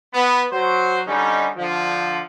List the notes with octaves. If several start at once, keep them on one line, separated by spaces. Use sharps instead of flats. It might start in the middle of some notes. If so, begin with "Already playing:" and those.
B3
F#3 C5
D3 G3 C#4 D#4
D3 F3